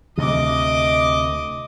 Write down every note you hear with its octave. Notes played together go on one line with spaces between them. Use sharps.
D2 C3 D#5 D6